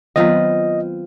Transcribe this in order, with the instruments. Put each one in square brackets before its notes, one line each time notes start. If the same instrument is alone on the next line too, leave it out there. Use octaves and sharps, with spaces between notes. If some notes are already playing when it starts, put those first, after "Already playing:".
[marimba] D#3 F#3 B3 [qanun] C4 F4 B4 [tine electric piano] D#5